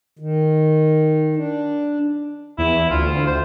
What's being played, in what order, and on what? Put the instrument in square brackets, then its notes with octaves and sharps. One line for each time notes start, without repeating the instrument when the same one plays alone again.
[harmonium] D#3
D4
[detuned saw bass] E2 [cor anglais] E4
[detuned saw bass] D2 [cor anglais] F4
[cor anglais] C5